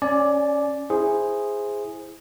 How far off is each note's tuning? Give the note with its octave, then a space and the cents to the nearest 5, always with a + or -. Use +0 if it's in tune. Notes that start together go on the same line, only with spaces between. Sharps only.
C#4 +0 D5 +0 G#5 +30
E4 +0 G#4 -5 C5 +0